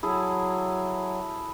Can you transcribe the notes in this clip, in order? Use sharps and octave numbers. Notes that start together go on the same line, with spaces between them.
F#3 E4 G#4 A4